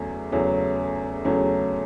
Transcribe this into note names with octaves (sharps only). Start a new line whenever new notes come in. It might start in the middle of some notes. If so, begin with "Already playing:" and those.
Already playing: E2 C#3 F#3 A3 C#4
E2 C#3 F#3 A3 C#4
E2 C#3 F#3 A3 C#4